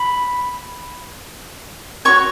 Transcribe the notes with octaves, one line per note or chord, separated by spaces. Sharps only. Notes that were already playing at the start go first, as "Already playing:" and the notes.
Already playing: B5
F#4 C#5 C#6